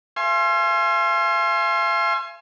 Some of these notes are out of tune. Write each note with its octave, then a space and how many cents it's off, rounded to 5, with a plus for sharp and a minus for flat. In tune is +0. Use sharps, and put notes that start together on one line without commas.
F5 -45 G#5 +15 C6 +25